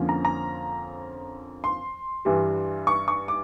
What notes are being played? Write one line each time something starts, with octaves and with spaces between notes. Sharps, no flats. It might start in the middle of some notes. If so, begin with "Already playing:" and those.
Already playing: F2 D3 F3 A#3 C#4
A#5
A#5
C6
G2 E3 G3
C#6
C#6
D6